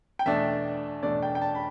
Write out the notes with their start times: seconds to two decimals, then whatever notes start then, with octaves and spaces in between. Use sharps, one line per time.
0.19 G5
0.26 E2 B2 A3 D4 E5
1.03 E2 B2 A3 D4 D5
1.23 G5
1.35 G5
1.42 A5
1.55 B5